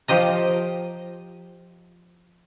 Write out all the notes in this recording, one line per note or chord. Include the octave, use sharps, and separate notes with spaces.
F3 G4 D#5 A#5